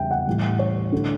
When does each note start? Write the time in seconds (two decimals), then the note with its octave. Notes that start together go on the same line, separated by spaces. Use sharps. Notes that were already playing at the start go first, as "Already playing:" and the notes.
Already playing: E2 C#3 G3 B3 E5 G5
0.11 F#5
0.27 A2 E3 G3
0.59 C#5
0.92 D3 A3